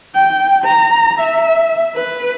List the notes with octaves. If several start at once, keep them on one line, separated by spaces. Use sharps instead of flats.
G5
A#5
E5
B4